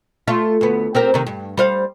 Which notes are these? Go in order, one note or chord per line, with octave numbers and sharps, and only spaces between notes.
A3 F4
D2 B3
C4 G4 A#4
C3 D#3
G2
G3 C5 F5